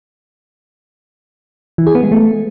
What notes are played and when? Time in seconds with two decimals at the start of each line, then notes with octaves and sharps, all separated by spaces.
1.78 E3
1.87 G#4
1.95 B3
2.03 G#3
2.11 A3